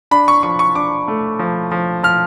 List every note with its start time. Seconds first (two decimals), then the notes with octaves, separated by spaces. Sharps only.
0.11 D4 B5
0.28 C#6
0.43 F3 C#6
0.59 C#6
0.75 D4 D6
1.08 A3
1.39 F3
1.72 F3
2.03 F3 F6